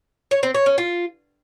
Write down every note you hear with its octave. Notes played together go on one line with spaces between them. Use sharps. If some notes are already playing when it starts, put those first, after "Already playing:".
C#5
C4
C#5
C#4
F4